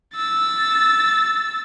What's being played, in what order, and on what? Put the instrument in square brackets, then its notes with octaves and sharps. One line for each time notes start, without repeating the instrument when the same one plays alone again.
[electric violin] E6 A6